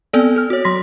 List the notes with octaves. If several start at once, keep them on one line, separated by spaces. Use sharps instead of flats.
B3 C4 A4 D5
A4 F6
F#4 C#5
F#3 C6 A#6 B6